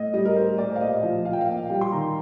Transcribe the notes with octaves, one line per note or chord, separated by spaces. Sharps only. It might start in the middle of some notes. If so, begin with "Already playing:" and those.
Already playing: A2 D#5
G3 D#5
A#4
G3 C5
A2 D5
F5
A#2 D#5
F3
F3 F5
G5
F5
A#2
G3 G5
C6
D#3 A#5